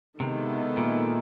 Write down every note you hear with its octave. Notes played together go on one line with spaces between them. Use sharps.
C3 D#3 G#3 B3 E4 A4
A#2